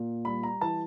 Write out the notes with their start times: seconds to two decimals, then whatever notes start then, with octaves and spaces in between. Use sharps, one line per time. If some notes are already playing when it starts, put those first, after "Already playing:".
Already playing: A#2
0.25 G3 B5
0.43 A#5
0.61 E3 A5